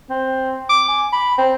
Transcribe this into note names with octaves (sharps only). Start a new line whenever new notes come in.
C4
D6
G#5
B5
C4